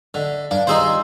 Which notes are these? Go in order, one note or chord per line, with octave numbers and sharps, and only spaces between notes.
D3 D#5 E5
G2 D4 F5
D#3 G3 D#4 F4 G#4 C5 C6 E6